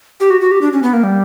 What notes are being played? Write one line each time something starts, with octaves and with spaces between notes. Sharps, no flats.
G4
F#4
F#4
G4
D4
C#4
B3
A#3
G3